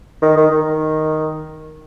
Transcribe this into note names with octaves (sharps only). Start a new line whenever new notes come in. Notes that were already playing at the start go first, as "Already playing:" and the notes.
D#3
D#3
D#3